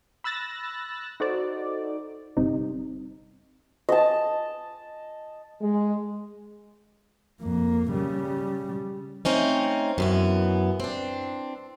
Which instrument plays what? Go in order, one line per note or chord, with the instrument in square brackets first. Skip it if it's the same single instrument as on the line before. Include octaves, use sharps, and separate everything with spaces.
[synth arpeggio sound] B5 E6 F#6 A6 A#6
D#4 F#4 A4 C5 D5
G1 C3 G3 C4 D#4
[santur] D#5 A5
[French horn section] G#3
[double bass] F2 A#3
C#3 G3
[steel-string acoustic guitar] A3 C4 C#4 D#4
F#2 E3 B3
C4 D4